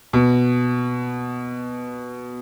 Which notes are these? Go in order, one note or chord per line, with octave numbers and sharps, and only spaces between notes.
B2